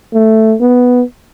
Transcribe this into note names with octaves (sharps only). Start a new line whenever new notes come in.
A3
B3